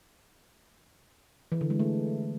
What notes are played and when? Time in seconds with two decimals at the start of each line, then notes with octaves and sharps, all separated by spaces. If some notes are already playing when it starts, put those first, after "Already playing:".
1.52 E3
1.61 D3
1.70 G#3
1.79 A3